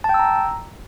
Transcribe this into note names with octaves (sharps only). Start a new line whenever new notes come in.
A5
G5
E6
A#5